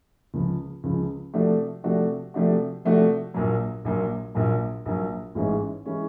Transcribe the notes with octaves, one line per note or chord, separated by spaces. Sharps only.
C#2 C#3 F3
C#2 C#3 F3
C3 F3 A3 D4 F#4
C3 F3 A3 D4 F#4
C3 F3 A3 D4 F#4
C3 F3 A3 D4 F#4
A#1 A#2 F#3
A#1 A#2 F#3
A#1 A#2 F#3
A#1 A#2 F#3
A1 G#2 E3 G#3 C#4
E3 G#3 C#4